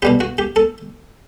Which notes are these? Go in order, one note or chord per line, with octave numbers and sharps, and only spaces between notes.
B2 G3 B3 G4
F#4
G4
A4